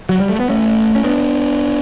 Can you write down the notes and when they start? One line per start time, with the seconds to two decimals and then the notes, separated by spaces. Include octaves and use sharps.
0.09 F#3
0.20 G3
0.29 A3
0.40 B3
0.49 A3 C#4
0.95 C#4
1.04 B3 D4